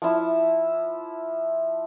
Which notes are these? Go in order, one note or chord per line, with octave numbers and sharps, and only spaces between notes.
F3 E4